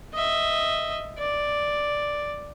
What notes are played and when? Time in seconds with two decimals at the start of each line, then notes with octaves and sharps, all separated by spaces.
0.14 D#5 E5
1.18 D5